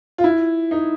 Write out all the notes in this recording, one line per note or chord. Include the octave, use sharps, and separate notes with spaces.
F4
E4
D#4